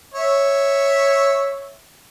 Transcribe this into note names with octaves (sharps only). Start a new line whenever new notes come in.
C#5 E5